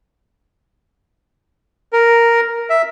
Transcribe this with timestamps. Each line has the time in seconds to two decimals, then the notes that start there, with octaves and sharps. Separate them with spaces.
1.93 A#4
2.70 E5